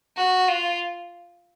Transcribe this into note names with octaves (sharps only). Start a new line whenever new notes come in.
F#4
F4